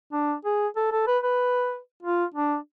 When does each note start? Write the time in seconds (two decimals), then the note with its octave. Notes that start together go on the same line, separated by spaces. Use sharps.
0.13 D4
0.45 G#4
0.76 A4
0.92 A4
1.07 B4
1.23 B4
2.03 F4
2.34 D4